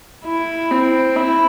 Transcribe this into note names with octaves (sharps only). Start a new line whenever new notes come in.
E4
C4
E4